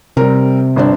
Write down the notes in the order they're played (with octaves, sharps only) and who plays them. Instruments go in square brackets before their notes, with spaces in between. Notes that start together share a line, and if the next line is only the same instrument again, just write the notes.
[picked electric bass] C3 [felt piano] G3 A#4
[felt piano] G1 C4 D4